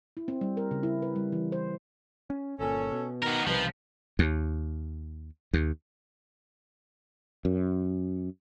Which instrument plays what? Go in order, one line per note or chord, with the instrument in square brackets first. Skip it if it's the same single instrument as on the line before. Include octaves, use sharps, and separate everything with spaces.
[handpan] E4
C4
G3
A#4
C#3
E4
B4
G3
E3
C5
[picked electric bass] C#4
[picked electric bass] G1 A#2 [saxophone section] C#4 A4
[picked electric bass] B2
[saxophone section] D#3 [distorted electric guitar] B3 A#4
[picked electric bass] B1 C3 G3 [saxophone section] D#3 B4 [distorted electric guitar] F3
[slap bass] D#2
D#2
[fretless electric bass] F#2